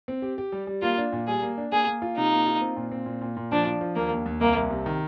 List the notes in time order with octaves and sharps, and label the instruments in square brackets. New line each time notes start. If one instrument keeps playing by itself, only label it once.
[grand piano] C4
G4
G4
G3
G3
[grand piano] A#3 [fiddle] F4
[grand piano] D4
A#2
[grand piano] G3 [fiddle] G#4
[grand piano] A#3
D4
[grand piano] A#3 [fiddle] G#4
[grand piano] A#3
F4
[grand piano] C3 [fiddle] D#4
[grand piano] A#3
F4
C4
A#2
C4
A#2
A#2
A#2
[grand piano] F3 [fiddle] D4
[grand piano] F3
F3
[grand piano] D#2 [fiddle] A#3
[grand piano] D#2
D#2
[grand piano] C2 [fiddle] A#3
[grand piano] C2
C3
D#3